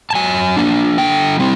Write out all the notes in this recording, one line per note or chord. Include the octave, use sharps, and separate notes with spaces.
A5
F#3 G#5
A#3 D4
D3 G5
G3 C4 E4